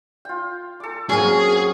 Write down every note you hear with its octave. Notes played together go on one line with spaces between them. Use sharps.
F4 G5
A4 D6
F#3 A#3 C4 C#4 G#4 A#4